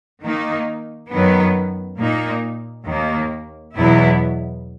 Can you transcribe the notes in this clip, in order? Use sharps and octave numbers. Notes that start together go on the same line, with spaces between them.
D#3 A#3 D#4
F#2 D#3 F#3 B3
A#2 A#3 D#4
D#2 D#3 A#3
E2 B2 F#3 B3 E4